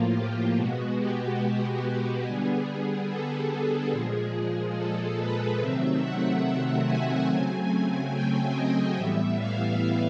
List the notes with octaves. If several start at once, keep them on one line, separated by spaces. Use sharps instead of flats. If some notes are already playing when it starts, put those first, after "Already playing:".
Already playing: A2 F3 A#3 F4
G4
B2 G#3 B3 F#4
G4
G4
D3 G3 B3 G#4
A4
A#2 F3 G#3 G#4
A4
B4
C3 D#3 F#3 A3 C4 E5
F#5
G#5
C#3 F#3 A3 C4 G#5
G5
D#5
A2 E3 G3 B3 E5
F5